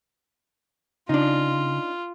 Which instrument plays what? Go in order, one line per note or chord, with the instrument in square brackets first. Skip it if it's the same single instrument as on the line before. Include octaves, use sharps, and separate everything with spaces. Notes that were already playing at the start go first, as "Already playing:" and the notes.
[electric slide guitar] C#3 [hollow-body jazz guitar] D4 D#4 [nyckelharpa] F4